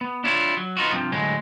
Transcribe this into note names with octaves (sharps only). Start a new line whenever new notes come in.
B3
D4 E4 F4 C#5
F#3
B3 D#4 F4 F#4
G2 C3 F3
D2 A2 F#3 G#3